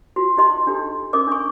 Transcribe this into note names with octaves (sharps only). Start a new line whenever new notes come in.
F4 F#4
D#4 G4 D#5 C6
D4 D#4 G4 A4
C#4 A#4 D#5 D6 D#6
D4 C#6